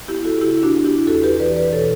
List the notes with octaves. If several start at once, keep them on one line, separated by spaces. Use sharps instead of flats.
B3 E4 G4
F#4 A4
C#3 E4 G4
D4 F#4
B3
E4 G4
E2 F#4 A4
G4 B4
E3 B4 D5
B4 D5
B2 A4 C#5